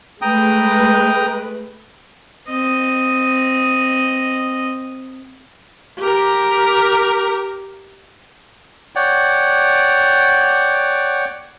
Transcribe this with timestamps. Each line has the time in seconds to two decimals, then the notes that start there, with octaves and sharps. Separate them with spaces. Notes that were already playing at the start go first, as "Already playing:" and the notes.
0.22 G#3 A3 B4 G5 A#5 D#6
2.49 C4 D#5
6.00 G4 A#4
8.95 C#5 D5 F#5 G5